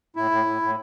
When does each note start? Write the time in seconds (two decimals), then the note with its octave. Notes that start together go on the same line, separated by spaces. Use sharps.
0.16 A2 E4
0.31 A2
0.46 A2
0.62 A2